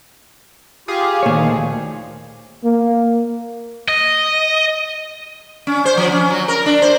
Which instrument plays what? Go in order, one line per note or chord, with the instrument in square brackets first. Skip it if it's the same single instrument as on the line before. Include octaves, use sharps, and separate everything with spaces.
[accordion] F4 G4 [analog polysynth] G#4 F5
[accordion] D2 F3 [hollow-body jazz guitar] A#2 C#5 [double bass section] D#3 A3
[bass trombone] A#3
[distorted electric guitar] D#5
[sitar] C#4
C5
F3
C#4
F#3
A#4
D4
C5